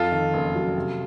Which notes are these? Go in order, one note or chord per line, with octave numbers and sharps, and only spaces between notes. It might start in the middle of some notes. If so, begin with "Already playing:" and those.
Already playing: F2 F4 A4
D#3
F#1
F#3
C3